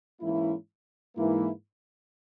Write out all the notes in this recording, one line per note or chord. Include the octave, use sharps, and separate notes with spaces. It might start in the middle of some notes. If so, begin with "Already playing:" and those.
G#2 E3 A#3 C#4 E4
G#2 E3 A#3 E4